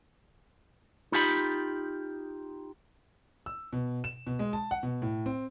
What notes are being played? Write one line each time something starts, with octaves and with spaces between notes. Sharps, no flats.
D#4 F4 G4 F#5 B5
E6
B2
E7
B2
G#3
A5
F#5
B2
A2
C4